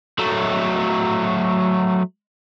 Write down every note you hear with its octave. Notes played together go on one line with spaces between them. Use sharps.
F#3 A3